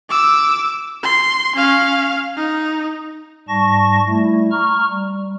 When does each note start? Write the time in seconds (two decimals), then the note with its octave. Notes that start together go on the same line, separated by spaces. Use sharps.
0.10 D6 E6
1.03 C6
1.56 C#4 F5
2.37 D#4
3.48 G#2 G3 A5 C#6 A#6
4.08 G3 A3 E4
4.51 A#5 C#6 F6
4.90 G3